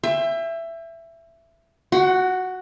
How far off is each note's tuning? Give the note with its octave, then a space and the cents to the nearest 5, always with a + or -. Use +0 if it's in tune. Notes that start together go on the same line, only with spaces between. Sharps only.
E5 +15 G5 +40
F#4 +0 F#5 +30